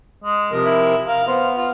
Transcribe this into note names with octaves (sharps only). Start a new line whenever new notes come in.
G#3
C3 F3 A#4
E4
A#4 F5
B3 C5 F6
F4